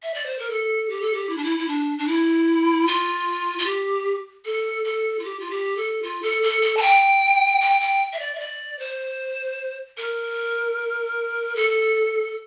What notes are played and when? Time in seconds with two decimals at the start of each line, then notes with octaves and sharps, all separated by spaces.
0.03 E5
0.14 D5
0.26 C5
0.39 A#4
0.50 A4
0.90 G4
1.01 A4
1.14 G4
1.29 E4
1.37 D4
1.44 E4
1.59 E4
1.68 D4
1.98 D4
2.07 E4
2.87 F4
3.58 F4
3.66 G4
4.45 A4
4.84 A4
5.19 F4
5.24 G4
5.40 F4
5.50 G4
5.77 A4
6.03 F4
6.22 A4
6.43 A4
6.62 A4
6.77 A5
6.82 G5
7.61 G5
7.81 G5
8.13 E5
8.19 D5
8.35 E5
8.40 D5
8.79 C5
9.97 A#4
11.56 A4